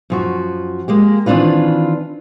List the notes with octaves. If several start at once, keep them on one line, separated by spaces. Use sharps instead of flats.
F#2 F3 F#4
G#3 A#3 G4
D#3 E3 C4 D4 F4 B4